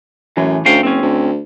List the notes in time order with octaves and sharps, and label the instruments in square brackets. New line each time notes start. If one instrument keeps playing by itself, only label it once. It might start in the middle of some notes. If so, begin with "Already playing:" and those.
[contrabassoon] F#2 [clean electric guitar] A2 E3
[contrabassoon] D2 [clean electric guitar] C#4 F5 G5
[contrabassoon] F#1 [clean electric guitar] C4 C#4
[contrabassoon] D2